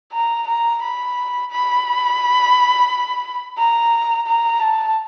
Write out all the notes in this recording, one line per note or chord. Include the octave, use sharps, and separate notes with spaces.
A#5
A#5
B5
B5
A#5
A#5
A5